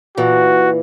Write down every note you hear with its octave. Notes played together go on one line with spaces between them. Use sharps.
A#2 E3 F#4